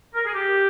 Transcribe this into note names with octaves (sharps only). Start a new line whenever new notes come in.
A#4
G#4
G4